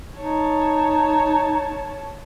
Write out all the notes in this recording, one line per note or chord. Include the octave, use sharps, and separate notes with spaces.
D#4 C#5 A5